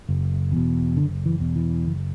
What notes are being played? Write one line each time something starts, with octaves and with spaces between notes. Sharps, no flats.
F#1
E2 B2
F#1 D3
E3
E2 B2
E3
F#1